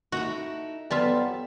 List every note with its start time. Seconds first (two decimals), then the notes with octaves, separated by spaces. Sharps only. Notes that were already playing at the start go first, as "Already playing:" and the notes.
0.12 D#4 E4 F#4 A4
0.91 F2 F#3 G3 B3 F4 A4 E5 A5